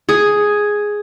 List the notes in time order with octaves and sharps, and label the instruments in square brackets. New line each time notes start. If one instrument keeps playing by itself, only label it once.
[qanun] G#4